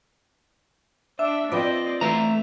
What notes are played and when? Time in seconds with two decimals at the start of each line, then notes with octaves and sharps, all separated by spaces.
1.19 D4 E5
1.52 F3 C4 B4 D5 D#5 G5
2.01 E3 A3 C5 E5 A#5 F7